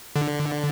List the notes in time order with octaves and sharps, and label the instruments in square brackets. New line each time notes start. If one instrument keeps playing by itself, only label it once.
[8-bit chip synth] D3